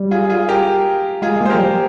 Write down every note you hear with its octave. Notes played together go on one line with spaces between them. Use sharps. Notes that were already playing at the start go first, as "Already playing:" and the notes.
Already playing: G3
F4 G#4
F4 G#4
G4 A#4
G#3 F4 G#4
G#3
A#3
C5
F3 G4 A#4
G3